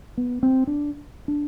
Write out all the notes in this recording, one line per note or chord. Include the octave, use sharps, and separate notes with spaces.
B3
C4
D4
D4